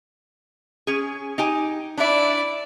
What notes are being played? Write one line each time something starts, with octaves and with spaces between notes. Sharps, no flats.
C#4 G#4
D#4 G4 G#5
D4 E4 D5 E5